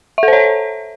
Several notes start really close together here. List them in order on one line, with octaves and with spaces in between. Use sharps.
E5 A4 C5 C#5